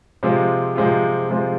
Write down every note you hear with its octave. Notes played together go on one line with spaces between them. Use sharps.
C3 F3 G#3 C4 F4
C3 F3 G#3 C4 F4
C3 F3 G#3 C4 F4